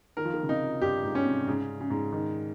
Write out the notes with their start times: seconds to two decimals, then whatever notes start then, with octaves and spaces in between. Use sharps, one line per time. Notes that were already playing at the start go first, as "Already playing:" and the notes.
0.17 D#3 A#4
0.25 F3
0.34 D#3
0.43 C#3
0.49 C3 D#4
0.81 G2 G4
1.04 G#2
1.15 C#4
1.25 C3
1.47 G#2 C#3
1.81 C#3
1.90 G#2
2.13 D#3